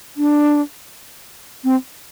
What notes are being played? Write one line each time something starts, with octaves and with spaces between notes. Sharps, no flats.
D4
C4